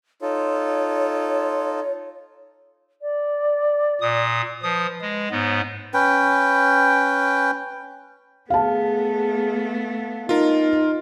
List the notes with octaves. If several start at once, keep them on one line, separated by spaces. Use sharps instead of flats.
D#4 F4 A4 C#5
D5
A#2 D#6
F3 B4 D#6
G#3
G#2 B3 C#5
C#4 B4 G5
A3 B3 G#4 F5 A5
D#4 F4 A#4